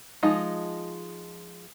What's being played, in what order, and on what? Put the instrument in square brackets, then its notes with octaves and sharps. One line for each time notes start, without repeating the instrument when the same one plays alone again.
[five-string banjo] F3 G#3 D#4